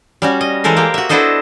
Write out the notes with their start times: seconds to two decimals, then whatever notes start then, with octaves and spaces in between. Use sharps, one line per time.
0.22 G3 C#4 F#4
0.41 D#5
0.64 E3 G#3 A4 A#4 C5
0.76 A#3 G4
0.94 F#4 E5
1.09 B3 D4 E4 A4 C5 D#5